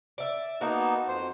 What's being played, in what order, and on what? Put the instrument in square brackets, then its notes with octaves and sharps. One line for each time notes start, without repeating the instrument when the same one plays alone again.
[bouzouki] D5 E5
[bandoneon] A#3 B3 D#4 [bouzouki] F#4 A5
[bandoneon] F2 C5